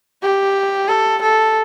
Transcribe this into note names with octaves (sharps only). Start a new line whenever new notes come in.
G4
A4
A4